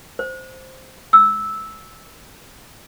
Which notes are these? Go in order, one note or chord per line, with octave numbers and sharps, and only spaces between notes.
C5
E6